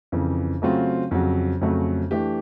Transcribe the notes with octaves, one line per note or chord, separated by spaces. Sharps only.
F2 C#3 E3
C#3 F#3 A3 C4 F4
F2 C#3 F#3
F2 C#3 F#3 A3
E3 A3 D4 G4